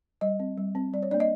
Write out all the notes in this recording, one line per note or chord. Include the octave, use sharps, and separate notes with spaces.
G3 D#5
C4
G3
C4
G3 D5
C#5
A#3 D4 D5
D#5